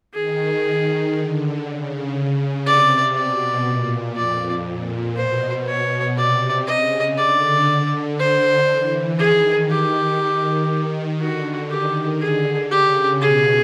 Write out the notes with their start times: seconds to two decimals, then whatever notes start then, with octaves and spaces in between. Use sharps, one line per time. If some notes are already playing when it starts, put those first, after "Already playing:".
0.14 D#3 G#4
1.15 D3
1.65 C#3
2.66 C3 D5
3.15 B2 D5
3.66 A#2
4.16 F2 D5
4.66 A#2
5.16 B2 C5
5.68 C#5
6.17 C3 D5
6.67 C#3 D#5
7.18 D3 D5
7.68 D3
8.19 C5
8.69 E3
9.19 D#3 G#4
9.70 G4
10.70 D#3
11.21 D3 F#4
11.70 D#3 G4
12.21 D3 G#4
12.71 C#3 G4
13.21 B2 G#4